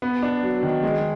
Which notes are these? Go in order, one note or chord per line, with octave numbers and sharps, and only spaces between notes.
B3
D4
F#3
D#3
G#3